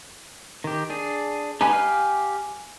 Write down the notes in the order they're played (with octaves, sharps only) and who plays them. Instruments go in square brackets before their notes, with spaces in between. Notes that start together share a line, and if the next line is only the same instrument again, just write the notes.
[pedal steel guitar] D#3 G4
D4 G#4
[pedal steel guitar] D#4 G4 B4 [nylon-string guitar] G#5
[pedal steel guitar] G4 F5